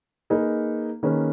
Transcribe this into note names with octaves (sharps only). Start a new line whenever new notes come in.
A#3 D#4 G#4 B4
D#3 A#3 C#4 G#4 B4